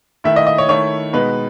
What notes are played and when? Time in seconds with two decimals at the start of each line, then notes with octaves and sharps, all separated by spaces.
0.24 D#3 A3 E4 E5
0.36 D#5
0.47 D#5
0.58 C#5
0.69 D#3 A3 E4 C#5
1.13 B2 G#3 B3 D#4 B4